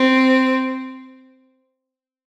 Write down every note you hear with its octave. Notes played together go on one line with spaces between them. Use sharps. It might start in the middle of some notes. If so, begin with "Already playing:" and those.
Already playing: C4